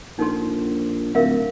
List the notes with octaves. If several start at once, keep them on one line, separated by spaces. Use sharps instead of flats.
A#1 D#4 A4 C6
D1 A#4 E5 F5